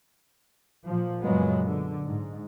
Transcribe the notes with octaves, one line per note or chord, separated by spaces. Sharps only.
A#2 F3
F#2 A#2 C#3 F#3 G#3 B3
D3
G#2